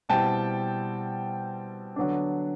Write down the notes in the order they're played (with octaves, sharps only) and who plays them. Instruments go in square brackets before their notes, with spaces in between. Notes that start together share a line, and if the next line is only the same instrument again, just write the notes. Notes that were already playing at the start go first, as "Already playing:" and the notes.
[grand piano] B2 G3 C4 E4 G5 A5
D3 F#3 B3 D4